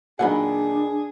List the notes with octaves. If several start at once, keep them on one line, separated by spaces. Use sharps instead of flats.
A#2 D#3 F3 F#3 D4 G#4 F#5 B5